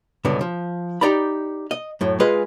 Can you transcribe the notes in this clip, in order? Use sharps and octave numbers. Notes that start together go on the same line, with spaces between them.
C#2 G2 B2 D3 B3
F3
D#4 G4 D5 A#5 B5
D#5
F#2 A2
G#3 F4 G#4 B4 D#5